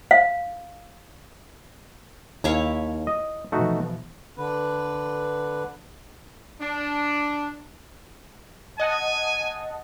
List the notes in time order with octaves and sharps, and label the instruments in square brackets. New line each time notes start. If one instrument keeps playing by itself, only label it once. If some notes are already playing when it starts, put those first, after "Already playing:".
[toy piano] F5
[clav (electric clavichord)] D#2 [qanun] E4 C#5 F5
[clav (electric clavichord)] D#5
[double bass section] B2 E3 F3 [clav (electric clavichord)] A3 D#4 F#4
[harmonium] D3 B4
[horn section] D4
[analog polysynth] D#5 F#5 A5 [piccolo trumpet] G#5